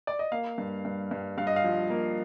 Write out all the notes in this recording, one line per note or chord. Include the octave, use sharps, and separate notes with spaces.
D5
D#5
A#3 F5
G2
G2
G2
G2 F5
D#5
F5
F3
A#3